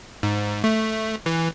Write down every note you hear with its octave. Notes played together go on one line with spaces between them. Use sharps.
G#2
A3
E3